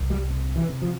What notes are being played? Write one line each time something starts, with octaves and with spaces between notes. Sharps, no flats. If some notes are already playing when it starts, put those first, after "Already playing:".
Already playing: C2
G3
C3
E3
C3
F3